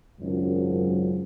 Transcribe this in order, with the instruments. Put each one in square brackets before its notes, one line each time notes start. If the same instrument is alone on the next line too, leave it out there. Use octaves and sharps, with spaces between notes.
[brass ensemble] G#1 C#2 F#2